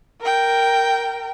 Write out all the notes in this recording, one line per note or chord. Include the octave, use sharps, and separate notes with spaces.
A#4 G5